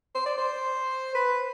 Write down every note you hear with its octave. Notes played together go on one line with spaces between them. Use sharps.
C5
D5
C5
B4